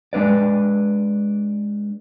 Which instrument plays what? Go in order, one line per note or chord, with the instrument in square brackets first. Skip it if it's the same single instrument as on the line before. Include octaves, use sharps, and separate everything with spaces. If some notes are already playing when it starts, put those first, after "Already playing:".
[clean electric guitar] G#3 D4 B4 D5